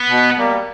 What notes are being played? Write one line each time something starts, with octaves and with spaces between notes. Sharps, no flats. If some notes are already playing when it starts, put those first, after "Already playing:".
Already playing: B3
B2
G3 A#3